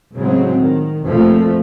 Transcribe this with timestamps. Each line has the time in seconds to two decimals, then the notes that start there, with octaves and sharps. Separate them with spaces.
0.16 A2 C#3 F#3 G#3 C4
0.55 D#3
1.04 F2 A#2 F3 A3